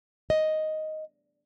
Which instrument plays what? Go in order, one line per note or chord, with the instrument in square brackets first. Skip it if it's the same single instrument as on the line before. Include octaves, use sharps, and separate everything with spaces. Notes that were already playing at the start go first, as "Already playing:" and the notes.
[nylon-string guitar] D#5